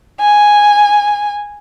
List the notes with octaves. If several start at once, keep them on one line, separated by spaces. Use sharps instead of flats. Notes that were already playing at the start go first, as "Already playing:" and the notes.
G#5